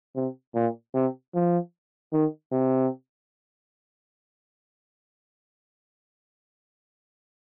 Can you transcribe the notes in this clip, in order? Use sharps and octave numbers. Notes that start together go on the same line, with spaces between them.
C3
A#2
C3
F3
D#3
C3